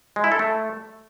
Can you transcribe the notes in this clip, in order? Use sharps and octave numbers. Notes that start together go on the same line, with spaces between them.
G#3
E4
A4
A3